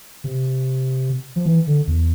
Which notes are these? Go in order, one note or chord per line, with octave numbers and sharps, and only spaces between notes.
C3
F3
E3
D3
E2